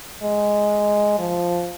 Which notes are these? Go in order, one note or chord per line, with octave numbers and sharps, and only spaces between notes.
G#3
F3